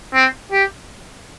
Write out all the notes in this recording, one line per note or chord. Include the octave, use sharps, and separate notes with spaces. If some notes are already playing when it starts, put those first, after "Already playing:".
C4
G4